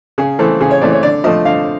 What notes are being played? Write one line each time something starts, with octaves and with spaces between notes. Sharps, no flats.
C#3 G#4
E3 A3 C4 A4
C#3 G#4
C#5
E3 A3 C4 D5
C#5
D3 D5
F3 A3 C4 D#5
D3 F5